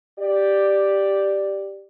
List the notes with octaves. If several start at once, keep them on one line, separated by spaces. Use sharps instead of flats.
G4 D5